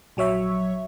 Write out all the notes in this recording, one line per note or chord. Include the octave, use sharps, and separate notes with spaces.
A#1 F#3 C#5 E5 C#6